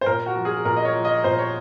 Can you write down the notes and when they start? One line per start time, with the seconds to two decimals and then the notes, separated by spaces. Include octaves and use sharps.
0.01 C5
0.06 A#2 A#4
0.26 F#4
0.36 F3
0.45 G#4
0.65 A#2 A#4
0.77 D#5
0.85 C#5
0.94 F3
1.05 D#5
1.24 A#2 C5
1.39 C#5